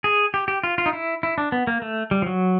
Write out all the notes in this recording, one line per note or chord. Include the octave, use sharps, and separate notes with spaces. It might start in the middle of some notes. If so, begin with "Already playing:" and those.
G#4
G4
G4
F4
F4
D#4
E4
E4
D4
B3
A#3
A3
G3
F3
F#3